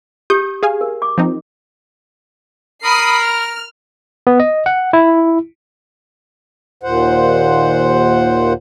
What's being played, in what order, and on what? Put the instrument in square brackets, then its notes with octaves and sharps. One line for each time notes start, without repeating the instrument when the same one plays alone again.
[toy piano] G4 [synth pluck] D#6 G6
[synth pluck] G#4 F5 G#5
[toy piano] A#4
D6
[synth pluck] F3 C4 D#4
[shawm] A#4 [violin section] B5 D#6 C7
[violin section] F6
[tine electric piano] B3
D#5
F#5
E4
[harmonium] D#2 A#2 C5 F#5